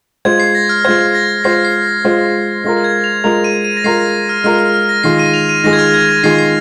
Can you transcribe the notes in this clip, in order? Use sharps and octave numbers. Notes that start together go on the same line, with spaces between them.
G#3 F4 C5 G#6
C7
A#6
F6
G#3 F4 C5 G#6
A#6
G#3 F4 C5 C7
C7
A#6
G#3 F4 C5
G#3 F4 A#4 A#6
G#6
F7
G#3 F4 A#4 F7
D#7
D#7
A#6
G#3 F4 A#4 C7
A#6
F6
G#3 F4 A#4 F6
F6
F6
A#6
D#3 G#3 F4 G#4 C7
D#7
F7
D#7
D#3 G#3 F4 G#4 A#6
G#6
F6
G#6
A#6
D#3 G#3 F4 G#4 C7
C7